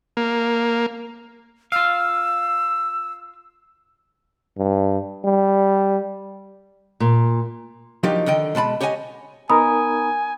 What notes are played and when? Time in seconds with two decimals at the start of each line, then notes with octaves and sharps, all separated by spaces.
0.17 A#3
1.72 F4 F5 E6
4.58 G2
5.24 G3
7.00 A#2
8.03 F3 F#3 A#3 D4 D#4 G4
8.26 D3 D#3 D#5 G5
8.55 B2 G#3 A5 B5
8.81 G4 C#5 D#5 F#5 G#5
9.50 B3 D#4 A#4 G#5 A#5 B5 D#6